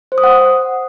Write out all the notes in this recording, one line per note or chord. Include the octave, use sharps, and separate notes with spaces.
C5
D#6
F#5